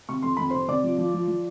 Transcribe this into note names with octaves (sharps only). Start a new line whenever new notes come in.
C3 C#6
F2 C6
F2 B5
C3 C5 C6
C3 D5 D6
F3
F3
F3
F3